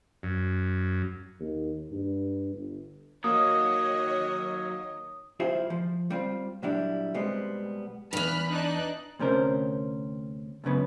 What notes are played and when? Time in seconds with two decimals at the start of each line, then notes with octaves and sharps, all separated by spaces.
0.23 F#2
1.40 D#2
1.92 G2
2.54 G1
3.24 D#3 F#3 A#3 F#4 C#5 D#5 D#6
5.40 B1 E4 F4 G4 G#4 C5
5.70 F3
6.10 G3 C4 F4
6.63 A#2 F#3 G3 D4 E4
7.14 B2 G3 G#3 B3 C4
8.13 E2 G2 B5 F6 F#6
8.49 D4 D#4 F#6
9.19 D2 C3 C#4 A#4 C5
10.64 C#2 F#2 C#3 B3